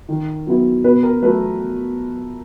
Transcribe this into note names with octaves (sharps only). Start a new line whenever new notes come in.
D#3
F#3 B3 E4
B2 B4
A#4
F#3 A3 B4